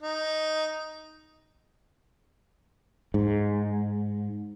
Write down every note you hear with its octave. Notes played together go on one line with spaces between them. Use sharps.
D#4
G#2